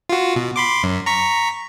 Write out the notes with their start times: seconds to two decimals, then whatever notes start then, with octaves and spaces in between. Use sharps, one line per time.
0.10 F4 F#4
0.36 B2
0.56 B5 C6 D6
0.83 F#2
1.06 A#5 C#6 B6